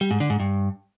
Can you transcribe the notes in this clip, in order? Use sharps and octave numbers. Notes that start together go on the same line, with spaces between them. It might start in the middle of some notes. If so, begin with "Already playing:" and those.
G3
G#2
D3
G#2
G2